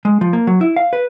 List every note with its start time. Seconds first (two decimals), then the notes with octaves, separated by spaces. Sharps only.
0.05 G#3
0.21 F3
0.33 A#3
0.47 F#3
0.61 E4
0.76 F5
0.93 B4